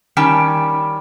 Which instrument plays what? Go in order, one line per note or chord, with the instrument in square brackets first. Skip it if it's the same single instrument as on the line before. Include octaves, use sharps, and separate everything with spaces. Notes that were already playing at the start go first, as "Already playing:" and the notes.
[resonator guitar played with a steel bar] D#3 G3 C#4 G5 A5